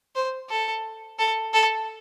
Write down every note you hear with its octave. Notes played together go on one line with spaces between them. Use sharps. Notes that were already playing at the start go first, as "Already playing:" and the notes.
C5
A4
A4
A4